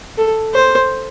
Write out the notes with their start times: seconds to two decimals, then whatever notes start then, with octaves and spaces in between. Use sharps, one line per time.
0.18 A4
0.54 C5